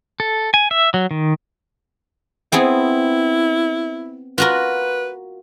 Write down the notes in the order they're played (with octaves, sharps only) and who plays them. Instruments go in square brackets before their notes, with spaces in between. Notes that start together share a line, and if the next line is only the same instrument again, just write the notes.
[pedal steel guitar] A4
G#5
E5
F#3
D#3
[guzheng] B3 C4 G#4 [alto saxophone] E4
[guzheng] F4 F#4 A#4 [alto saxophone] B4